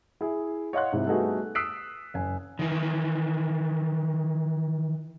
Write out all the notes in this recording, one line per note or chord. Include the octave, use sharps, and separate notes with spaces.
E4 G#4
C#5 D#5 F5 F#5 C6 F#6
G#2 C3 E4
G3 A3 B3 D#4 F#4 G#4
D#6 E6 F#6 B6 C7 D7
F#1 G#5
D#3 E3